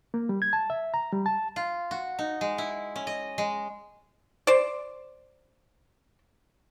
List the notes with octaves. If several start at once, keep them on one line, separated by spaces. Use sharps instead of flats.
A#3
G3
G#6
A5
E5
A#5
G3
A5
F4
F#4
D#4
G#3
E4
C#4
D#5
G#3
C5 D5